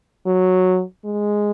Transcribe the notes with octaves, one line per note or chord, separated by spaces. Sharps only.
F#3
G#3